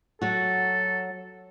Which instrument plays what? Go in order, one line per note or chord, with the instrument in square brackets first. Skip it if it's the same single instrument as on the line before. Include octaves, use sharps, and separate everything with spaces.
[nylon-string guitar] F#3 F#4 [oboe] A4